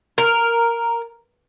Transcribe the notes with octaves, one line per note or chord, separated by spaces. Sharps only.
A#4